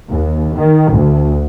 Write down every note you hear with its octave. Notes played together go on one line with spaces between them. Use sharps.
D#2
D#3
D2